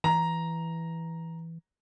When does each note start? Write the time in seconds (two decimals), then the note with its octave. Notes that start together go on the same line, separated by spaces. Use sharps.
0.04 E3 A#5